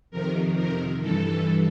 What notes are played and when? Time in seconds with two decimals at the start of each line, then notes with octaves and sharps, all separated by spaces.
0.11 F2 C3 D#3 A#4
0.56 A#4
1.01 G2 E3 A4